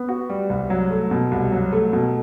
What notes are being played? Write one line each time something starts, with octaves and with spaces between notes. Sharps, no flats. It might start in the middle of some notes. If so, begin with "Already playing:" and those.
Already playing: B3
F#4
G3
C2
F#3
A3
B2
C2
F#3
A3
B2